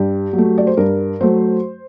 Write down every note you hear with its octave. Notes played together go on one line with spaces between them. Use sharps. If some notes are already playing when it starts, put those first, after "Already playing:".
Already playing: G2 G4
F#3
A3
D5
C5
G2 A#4
F#3 A3 C5